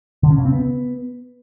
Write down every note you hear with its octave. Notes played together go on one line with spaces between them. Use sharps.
D3
C#4
C#3
C4
B3